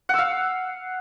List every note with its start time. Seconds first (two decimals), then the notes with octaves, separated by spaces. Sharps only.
0.09 F#5
0.14 E6
0.19 F5